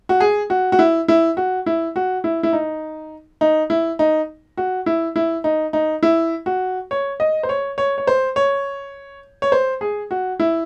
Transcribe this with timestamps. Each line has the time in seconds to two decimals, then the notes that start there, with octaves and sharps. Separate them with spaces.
0.09 F#4
0.20 G#4
0.50 F#4
0.72 F#4
0.79 E4
1.08 E4
1.37 F#4
1.66 E4
1.96 F#4
2.24 E4
2.43 E4
2.53 D#4
3.41 D#4
3.70 E4
3.99 D#4
4.57 F#4
4.86 E4
5.16 E4
5.44 D#4
5.73 D#4
6.03 E4
6.46 F#4
6.91 C#5
7.20 D#5
7.43 C5
7.49 C#5
7.78 C#5
7.98 C#5
8.07 C5
8.36 C#5
9.42 C#5
9.52 C5
9.81 G#4
10.11 F#4
10.40 E4